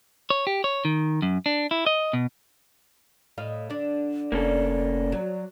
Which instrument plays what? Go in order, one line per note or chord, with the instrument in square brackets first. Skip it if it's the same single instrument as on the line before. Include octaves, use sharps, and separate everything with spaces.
[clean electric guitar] C#5
G4
C#5
D#3
F#2
D4
E4
D#5
B2
[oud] A2 D#5 F5
D3 D4
[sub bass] F1 [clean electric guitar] A#3 C#4 A4 [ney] D5
[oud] F#3